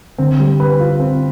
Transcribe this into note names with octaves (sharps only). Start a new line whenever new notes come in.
D3 C4
G3
B4
F4
C4